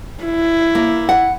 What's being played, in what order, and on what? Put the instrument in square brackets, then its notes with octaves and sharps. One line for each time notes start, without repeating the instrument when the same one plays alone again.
[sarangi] E4
[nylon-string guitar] A#3
F#5